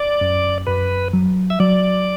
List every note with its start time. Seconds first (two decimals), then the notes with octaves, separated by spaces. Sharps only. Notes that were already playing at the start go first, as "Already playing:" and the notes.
Already playing: D5
0.21 F#2
0.67 F#2 B4
1.13 F#3
1.50 E5
1.60 F#3 D5